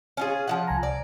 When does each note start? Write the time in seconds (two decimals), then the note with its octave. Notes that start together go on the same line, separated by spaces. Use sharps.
0.17 C#4 F4 G#4
0.47 F3 F#3 F#5
0.67 C2 G#5 A#5
0.83 D5